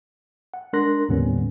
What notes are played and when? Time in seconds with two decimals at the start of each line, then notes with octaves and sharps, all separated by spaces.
0.54 F#5
0.73 G#3 D4 A#4 C6 F#6 A#6
1.09 D#2 A2 D3 G3 B3 C#4